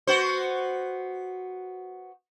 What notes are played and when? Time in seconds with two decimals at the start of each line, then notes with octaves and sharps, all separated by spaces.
0.07 B3 F#4 C5